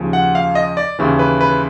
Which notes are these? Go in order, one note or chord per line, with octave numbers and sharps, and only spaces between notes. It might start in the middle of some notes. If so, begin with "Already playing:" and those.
Already playing: D#2 C#3 F3
F#5
F5
D#5
D5
D#2 C#3 E3
B4
B4